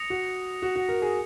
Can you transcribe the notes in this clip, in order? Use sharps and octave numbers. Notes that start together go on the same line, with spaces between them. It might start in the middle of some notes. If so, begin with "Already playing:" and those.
Already playing: D#6 A#6 C#7 F7
F#4
F#4
F#4
A#4
G#4